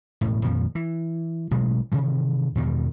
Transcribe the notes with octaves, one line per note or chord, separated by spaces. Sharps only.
E1 A2
F2 A#2 D#3 F3
E3
A1 B2 F#3 G#3
C3 D#3 E3
E2 G2 B2 D#3